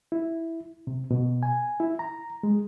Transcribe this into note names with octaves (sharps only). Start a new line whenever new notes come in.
E4
C3
B2
G#5
E4
A#5
G#3